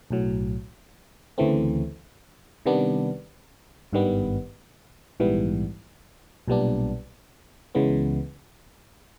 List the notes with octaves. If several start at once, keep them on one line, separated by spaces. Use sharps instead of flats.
B1 A2 F#3
D2 C#3 E3 A3 C4
C3 D#3 G3 B3 D4
G#1 G2 D#3 G3 B3
A#1 G#2 E3 G3 B3
B1 A#2 G3 B3 D4
C#2 C#3 E3 G#3 B3